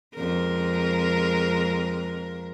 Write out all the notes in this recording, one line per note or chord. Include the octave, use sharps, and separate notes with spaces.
F2 G#3 A#4